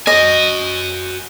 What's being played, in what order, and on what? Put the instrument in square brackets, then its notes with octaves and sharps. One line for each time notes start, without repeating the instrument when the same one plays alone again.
[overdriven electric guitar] F#4 G#5 [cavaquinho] D#5